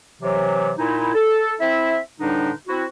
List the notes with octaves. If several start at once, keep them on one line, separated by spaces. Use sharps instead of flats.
C3 E3 F#3
A#2 D#4 E4
A4
C4 E4 E5
E2 A2 D3 G3 D4 D#4
C4 E4 F#4